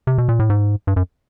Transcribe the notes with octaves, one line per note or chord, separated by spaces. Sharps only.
C3
B2
A#2
A2
G#2
G2
F#2